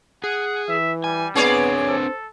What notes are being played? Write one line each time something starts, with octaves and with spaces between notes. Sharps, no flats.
G#4 F#5
E3 E5
G3 G#5
B3 C4 D4 G#4 B4 C#5 D5
A4 C5